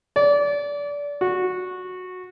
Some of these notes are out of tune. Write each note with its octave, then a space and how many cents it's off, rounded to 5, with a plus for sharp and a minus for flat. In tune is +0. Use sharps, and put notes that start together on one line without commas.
D5 -25
F#4 -15